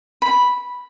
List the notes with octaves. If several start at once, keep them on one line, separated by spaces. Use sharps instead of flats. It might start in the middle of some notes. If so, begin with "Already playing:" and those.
B5